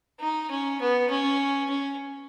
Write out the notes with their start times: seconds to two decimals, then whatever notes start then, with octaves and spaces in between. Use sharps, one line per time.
0.20 D#4
0.51 C#4
0.81 B3
1.10 C#4
1.70 C#4